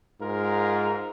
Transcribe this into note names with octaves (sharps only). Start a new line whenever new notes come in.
G#2 F4 A#4